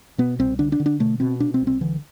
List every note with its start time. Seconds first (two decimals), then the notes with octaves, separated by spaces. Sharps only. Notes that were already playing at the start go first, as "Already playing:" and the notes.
0.18 B2 B3
0.39 C2 C4
0.59 D3 D4
0.72 D4
0.80 D3
0.86 D4
1.00 B2 A3
1.20 B2 C4
1.40 C3 D4
1.54 C4
1.61 C2
1.67 C4
1.81 D3 E3